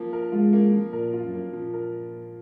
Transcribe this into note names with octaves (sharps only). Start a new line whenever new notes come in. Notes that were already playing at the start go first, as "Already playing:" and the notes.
Already playing: F3 A#3
A#4
G#3 F4
A#3
F3
A#2 A#4
F4
F#2
A#3
A#2 F3
A#4